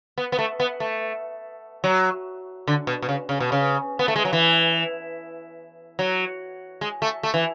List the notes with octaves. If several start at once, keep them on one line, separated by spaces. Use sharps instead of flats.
B3
B3
A3
B3
A3
F#3
D3
B2
B2
C#3
C#3
B2
C#3
B3
A3
G#3
F#3
E3
F#3
G#3
A3
A3
E3